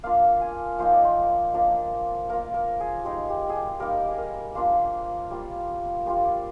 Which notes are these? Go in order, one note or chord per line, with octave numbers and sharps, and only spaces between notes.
A#3 D4 F4 F5
G#5
F3 A#3 D#4 C5
D5
C5
F3 A#3 D4 A#4
A#3 F4 A#4
A#4
G#4
G#3 D#4 G4
G4
G#4
G4
G3 A#3 D#4 A#4
G#4
A#4
A#3 D4 F4 C5
G3 A#3 F4
G3 D4 F4 C5
D5